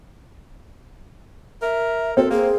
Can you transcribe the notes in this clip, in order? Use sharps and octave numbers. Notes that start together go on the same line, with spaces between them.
A#4 E5
C4 F#4 A4
A#3 G#4